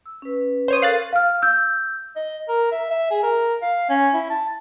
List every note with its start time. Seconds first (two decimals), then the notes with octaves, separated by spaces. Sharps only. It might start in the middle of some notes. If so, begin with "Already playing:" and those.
0.06 E6
0.22 C#4 B4
0.68 C5 C#5 D#6
0.82 A4 A#4 F5 F#6 A6
1.13 F5 F6
1.42 E6 G6
2.16 D#5
2.48 A#4
2.72 E5
2.90 E5
3.11 G#4
3.23 A#4
3.62 F5
3.90 C#4
4.14 E4
4.30 A5